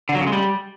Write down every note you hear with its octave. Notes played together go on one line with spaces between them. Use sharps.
D3
F#3
C#3
G#3
G3